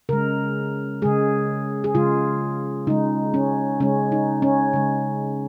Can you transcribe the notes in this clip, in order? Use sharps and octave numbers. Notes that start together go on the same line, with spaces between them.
C#3 G#3 A#4
C#3 G#3 G#4
G#4
C#3 G#3 F4
C#3 G#3 D#4
C#4
C#3 G#3 C#4
D#4
C#4
C#3 G#3